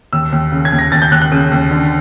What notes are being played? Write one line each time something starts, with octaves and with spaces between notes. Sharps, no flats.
D#2 E6
D#2
C#3
G#6
D#2
A#6
D#2 A6
G6
D#2 F#6
F#6
C#3
D#2
D3